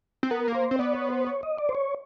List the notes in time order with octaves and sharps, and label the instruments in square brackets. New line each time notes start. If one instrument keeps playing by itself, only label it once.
[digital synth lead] C4
[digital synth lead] B3 [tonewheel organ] A#4
[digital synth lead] A#3
[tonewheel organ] C5
[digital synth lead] C4
[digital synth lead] B3 [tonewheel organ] D5
[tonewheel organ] C#5
C5
C#5
D#5
D5
C5
C#5